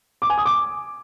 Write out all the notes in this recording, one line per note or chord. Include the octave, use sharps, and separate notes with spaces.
D6
G#5
D#6
D6